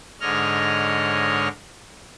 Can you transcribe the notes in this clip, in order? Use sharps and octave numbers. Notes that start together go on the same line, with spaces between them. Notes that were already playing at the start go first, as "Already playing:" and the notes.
G#2 D3 C#5 D#5 F6